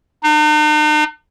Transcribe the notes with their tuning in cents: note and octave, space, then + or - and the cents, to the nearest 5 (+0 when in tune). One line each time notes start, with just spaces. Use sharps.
D#4 -45